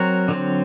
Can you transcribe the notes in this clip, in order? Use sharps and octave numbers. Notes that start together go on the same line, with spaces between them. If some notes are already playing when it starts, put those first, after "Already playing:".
Already playing: F#3 C4 F#4 A#4
D3 F#3 C4